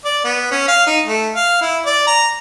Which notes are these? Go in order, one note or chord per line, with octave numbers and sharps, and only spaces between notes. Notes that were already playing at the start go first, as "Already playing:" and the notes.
D5
B3
C#4
F5
D#4
A3
F5
E4
D5
A#5